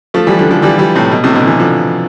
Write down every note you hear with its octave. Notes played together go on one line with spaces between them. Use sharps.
F3 A3
E3 G3
D3 F3
D3 F3
E3 G3
E3 G3
A2 C3
B2
A2 C3
B2 D3
C3 E3
D3 F3